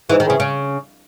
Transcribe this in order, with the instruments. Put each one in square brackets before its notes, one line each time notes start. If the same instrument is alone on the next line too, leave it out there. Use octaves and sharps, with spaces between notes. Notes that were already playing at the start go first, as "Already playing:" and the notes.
[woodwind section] G#2 [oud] E3
[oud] D#3
[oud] C#3 [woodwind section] E3 C4 E4 G#4
[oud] C#3